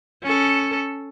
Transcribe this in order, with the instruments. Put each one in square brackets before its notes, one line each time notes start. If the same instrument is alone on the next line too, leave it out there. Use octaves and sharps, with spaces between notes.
[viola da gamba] C#4 A4